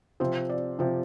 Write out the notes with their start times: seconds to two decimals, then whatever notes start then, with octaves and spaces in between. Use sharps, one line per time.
0.20 C3 F3 C4 C5
0.49 D5
0.79 C3 F3 C4